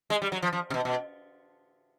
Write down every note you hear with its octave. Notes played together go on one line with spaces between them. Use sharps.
G#3
G3
F#3
F3
F3
C3
B2
B2